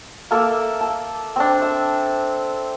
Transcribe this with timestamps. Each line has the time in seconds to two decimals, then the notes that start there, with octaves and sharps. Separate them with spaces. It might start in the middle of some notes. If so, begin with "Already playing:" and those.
0.31 A#3 A4 E5 D6
0.81 A5
1.36 C4 D4
1.62 E5